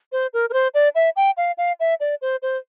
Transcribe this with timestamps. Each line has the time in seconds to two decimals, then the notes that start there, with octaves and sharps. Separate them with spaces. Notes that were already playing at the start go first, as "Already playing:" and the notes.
0.12 C5
0.33 A#4
0.50 A#4
0.53 C5
0.74 D5
0.95 E5
1.16 G5
1.37 F5
1.58 F5
1.80 E5
2.00 D5
2.22 C5
2.42 C5